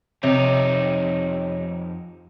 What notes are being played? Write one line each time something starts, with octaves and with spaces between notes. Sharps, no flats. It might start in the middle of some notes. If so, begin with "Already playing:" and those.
F2 C3 D#4 C#5 D#5